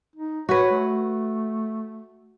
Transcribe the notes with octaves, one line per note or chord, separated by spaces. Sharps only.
D#4
F#4 B4 C#5
A3